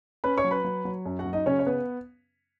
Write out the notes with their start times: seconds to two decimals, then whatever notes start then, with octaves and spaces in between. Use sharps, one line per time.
0.24 C#4 B4 B5
0.38 C#5 C#6
0.44 F#3
0.51 B4 B5
0.65 F#3
0.85 F#3
1.06 F#2
1.19 F#4 F#5
1.26 F#3
1.33 D#4 D#5
1.46 C#3 C#4 C#5
1.59 C#5
1.66 B3 B4